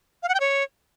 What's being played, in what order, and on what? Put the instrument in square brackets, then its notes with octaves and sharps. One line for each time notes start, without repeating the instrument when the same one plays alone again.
[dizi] F5
F#5
G5
C#5